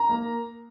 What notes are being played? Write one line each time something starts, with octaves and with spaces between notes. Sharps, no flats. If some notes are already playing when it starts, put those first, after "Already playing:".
Already playing: A#5
A#3